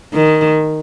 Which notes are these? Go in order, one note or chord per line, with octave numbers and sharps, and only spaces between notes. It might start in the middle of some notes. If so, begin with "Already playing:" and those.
D#3